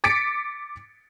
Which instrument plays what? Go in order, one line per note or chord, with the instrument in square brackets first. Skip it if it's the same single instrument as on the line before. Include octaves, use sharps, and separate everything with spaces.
[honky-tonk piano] D6 A6 B6 C#7 D7